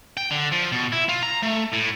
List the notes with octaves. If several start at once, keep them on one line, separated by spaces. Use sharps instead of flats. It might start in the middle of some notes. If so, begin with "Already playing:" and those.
G5
D3
F3
B2
E4
F4
A#5
A3
A2